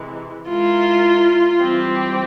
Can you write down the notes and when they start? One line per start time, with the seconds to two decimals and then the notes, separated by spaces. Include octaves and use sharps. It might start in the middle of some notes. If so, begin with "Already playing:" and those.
Already playing: C3 E3 G#3
0.48 G#3 E4 F4 A#4
1.58 E3 G3 C4 G4 C5